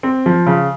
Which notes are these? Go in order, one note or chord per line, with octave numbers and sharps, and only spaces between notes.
C4
F3
C#3